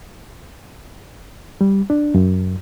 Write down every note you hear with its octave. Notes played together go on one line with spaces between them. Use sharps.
G3
D4
F#2